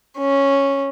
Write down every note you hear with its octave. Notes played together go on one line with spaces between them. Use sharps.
C#4